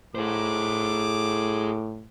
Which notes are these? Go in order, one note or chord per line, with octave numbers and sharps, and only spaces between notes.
A2 G#4 C5 D6